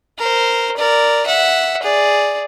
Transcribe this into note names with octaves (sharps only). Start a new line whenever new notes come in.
A#4 C5
A#4 D5
E5 F#5
G#4 D5